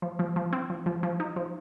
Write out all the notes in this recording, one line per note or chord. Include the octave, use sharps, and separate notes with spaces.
F3
F3
F3
C4
F3
F3
F3
D#4
F3